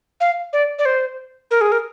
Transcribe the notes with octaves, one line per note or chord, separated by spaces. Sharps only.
F5
D5
D5
C5
A#4
G#4
A#4